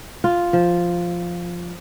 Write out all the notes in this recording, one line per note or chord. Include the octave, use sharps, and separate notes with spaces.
F4
F3